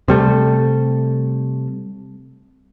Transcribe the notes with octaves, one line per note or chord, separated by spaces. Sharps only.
C3 G3 A3